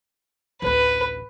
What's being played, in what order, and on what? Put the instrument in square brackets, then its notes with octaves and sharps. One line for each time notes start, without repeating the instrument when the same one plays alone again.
[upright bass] A1 D2 [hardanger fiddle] B4